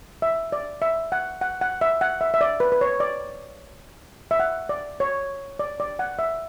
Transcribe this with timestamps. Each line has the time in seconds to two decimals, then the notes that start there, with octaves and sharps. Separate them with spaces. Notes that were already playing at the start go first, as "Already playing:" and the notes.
0.22 E5
0.52 D5
0.82 E5
1.12 F#5
1.41 F#5
1.61 F#5
1.81 E5
2.01 F#5
2.21 E5
2.34 E5
2.41 D5
2.60 B4
2.72 B4
2.81 C#5
3.00 D5
4.31 E5
4.40 F#5
4.69 D5
5.00 C#5
5.59 D5
5.80 D5
5.99 F#5
6.19 E5